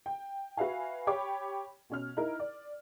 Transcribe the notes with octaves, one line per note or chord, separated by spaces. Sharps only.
G5
F#4 B4 E5 F5 G#5
G4 C#5 B5 D6
B2 C#4 F6
D#4 E4 A#4
D5